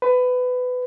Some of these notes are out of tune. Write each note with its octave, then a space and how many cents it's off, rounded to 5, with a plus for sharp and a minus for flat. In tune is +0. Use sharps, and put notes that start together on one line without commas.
B4 +20